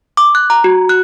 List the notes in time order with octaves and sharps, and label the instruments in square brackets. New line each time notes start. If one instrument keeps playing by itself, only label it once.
[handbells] D6
F#6
A#5
F#4
F#6